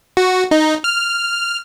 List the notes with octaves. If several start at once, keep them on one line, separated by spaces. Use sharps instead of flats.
F#4
D#4
F6